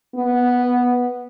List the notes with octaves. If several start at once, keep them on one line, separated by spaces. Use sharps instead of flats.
B3